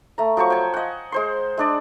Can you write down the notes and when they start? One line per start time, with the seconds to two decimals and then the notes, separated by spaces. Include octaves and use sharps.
0.18 A3 A#5
0.37 F3 F#3 C5 C#6
0.50 G5 G#5
0.74 D#5 F#5
1.12 G#3 C5 C6
1.57 G#3 D4 D5